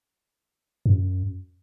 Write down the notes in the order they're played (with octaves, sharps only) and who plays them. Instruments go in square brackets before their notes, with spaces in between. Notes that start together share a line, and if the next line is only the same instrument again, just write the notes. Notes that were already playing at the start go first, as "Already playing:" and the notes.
[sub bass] F#2